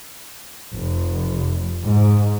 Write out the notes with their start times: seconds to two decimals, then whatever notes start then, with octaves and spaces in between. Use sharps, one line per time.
0.70 F1
1.84 G#2